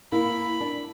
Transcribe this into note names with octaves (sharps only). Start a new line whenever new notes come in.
A#3 E4 B5
D4